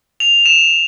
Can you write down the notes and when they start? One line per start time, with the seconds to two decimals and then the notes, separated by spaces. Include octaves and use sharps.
0.20 F7
0.46 E7